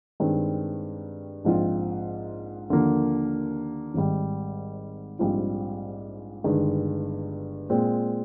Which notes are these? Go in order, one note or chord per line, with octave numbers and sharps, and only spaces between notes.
G2 D#3 G#3 C4
A#1 G#2 F3 C4 F4
D#2 D3 F3 A#3
G#1 G#2 G3
A#1 G#2 G3 C4 F4
G1 G2 D#3 G#3
A#2 G#3 C4